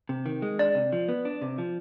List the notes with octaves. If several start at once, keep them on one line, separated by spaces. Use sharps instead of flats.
C3
D#3
G#3
D4 D5
C3
F3
B3
D4
C3
F3